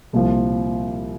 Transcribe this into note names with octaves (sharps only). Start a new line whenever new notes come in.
C2 A#2 F3